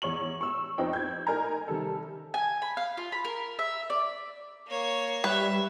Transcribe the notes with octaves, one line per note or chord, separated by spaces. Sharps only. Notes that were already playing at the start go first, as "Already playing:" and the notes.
E2 C#5 C#6 F#7
C#6 E6
F2 C4 D#4 F4 B4 G5
G6 G#6
D#4 A#4 G#5 A#5
C3 D#3 G3 A4
G#5
B5
F5
F4
B5
A#4
E5
D5
A#3 C#5
G3 B4 C#5 E5